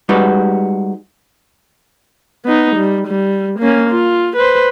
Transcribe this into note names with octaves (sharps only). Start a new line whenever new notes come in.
G3 G#3 D#4 F#4 G4 B4
B3 D#4
G3
G3
A#3 C#4
F4
B4 C5